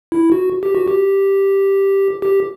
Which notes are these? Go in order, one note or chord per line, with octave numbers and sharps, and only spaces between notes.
E4
F#4
G4
F#4
G4
G4